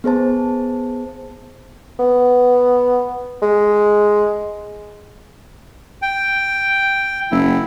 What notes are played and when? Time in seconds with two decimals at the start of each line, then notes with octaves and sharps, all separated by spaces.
0.04 B3 G#4 C5 A5
2.00 B3
3.42 G#3
6.02 G5
7.31 F#1 E4